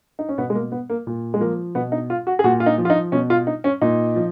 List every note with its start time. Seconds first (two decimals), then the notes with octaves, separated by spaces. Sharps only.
0.19 D#4
0.29 C#4
0.38 B2 B3
0.50 G#3
0.55 A#3
0.72 B3
0.90 A#3
1.07 A#2
1.34 G#3
1.40 F3 A#3
1.75 B2 B3
1.92 D#4
2.10 F4
2.27 F#4
2.39 G#4
2.44 A#2 F#4
2.60 F4
2.66 D#4
2.78 F3
2.85 F4
2.90 D#4
3.12 B2 C#4
3.30 F4
3.47 D#4
3.64 C#4
3.82 A#2 D#4
4.16 F3